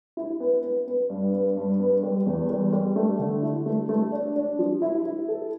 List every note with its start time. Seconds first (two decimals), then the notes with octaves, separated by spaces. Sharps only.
0.17 E4
0.40 B3
0.63 B3
0.87 B3
1.10 G2
1.33 B3
1.57 G2
1.80 B3
2.03 G3
2.26 E2
2.50 G3
2.73 G3
2.96 A3
3.19 D3
3.43 E4
3.66 A3
3.89 A3
4.12 D4
4.36 D4
4.59 F3
4.82 E4
5.05 E4
5.28 A4